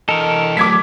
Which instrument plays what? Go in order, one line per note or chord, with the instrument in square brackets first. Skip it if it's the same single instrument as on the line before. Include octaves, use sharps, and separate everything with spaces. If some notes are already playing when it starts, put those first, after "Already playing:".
[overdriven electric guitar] E3 D#5 [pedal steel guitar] A4 A#4
[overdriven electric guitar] F#3 A3 [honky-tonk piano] D6 G#6 B6